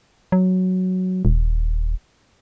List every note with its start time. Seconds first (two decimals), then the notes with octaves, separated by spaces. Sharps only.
0.32 F#3
1.25 D#1